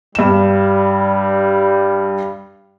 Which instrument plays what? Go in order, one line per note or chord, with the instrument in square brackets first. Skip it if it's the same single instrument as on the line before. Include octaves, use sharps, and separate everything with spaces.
[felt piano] G2 E7 [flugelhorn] G3